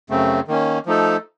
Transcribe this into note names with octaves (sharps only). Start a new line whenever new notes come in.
F#2 C#3 A3 C4
D#3 A#3 C#4
F3 A3 D#4 A4